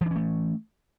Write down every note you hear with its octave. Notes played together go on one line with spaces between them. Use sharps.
E3 A3 C#4 D4